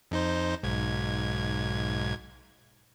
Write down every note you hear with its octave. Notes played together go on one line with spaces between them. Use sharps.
F2 D#4 C5
B1 G#2 G#6